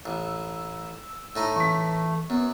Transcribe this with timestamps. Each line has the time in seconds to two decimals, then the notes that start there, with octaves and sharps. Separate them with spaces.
0.05 A1 E6
1.36 A2 A3 D#4 D#5
1.56 E3 C#6 B6
2.30 F#2 B3